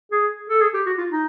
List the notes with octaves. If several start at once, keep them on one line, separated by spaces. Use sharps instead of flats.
G#4
A4
G#4
G4
F#4
F4
D#4